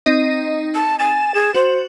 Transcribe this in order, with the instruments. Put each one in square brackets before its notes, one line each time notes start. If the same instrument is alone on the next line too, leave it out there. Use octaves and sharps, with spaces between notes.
[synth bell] C4 D#4 D#5
[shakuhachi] A5
[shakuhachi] G#5 [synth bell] A6 E7
[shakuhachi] G#4 [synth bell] E7
[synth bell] F#4 [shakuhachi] C5